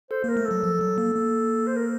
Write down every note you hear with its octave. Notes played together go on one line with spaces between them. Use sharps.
A4 C5
A#3 A#4
A3
A4
F#3
F3
F#3
A#3
A#3
C5
A#4